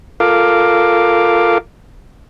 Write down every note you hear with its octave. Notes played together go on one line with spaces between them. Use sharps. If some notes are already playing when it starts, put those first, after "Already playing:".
F4 A4 A#4 F5 D6